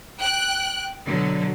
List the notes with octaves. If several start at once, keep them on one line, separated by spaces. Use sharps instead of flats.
G5 F#6
B2 D3 F#3